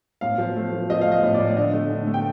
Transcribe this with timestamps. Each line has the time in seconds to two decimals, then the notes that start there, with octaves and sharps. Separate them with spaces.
0.21 A2 F5
0.38 F3
0.56 A3
0.72 F3
0.90 F3 D#5
1.01 A3 F5
1.12 D#5
1.23 A2
1.34 D5
1.40 A2
1.57 D3 D#5
1.73 A3
1.90 D3
2.07 A3
2.14 G5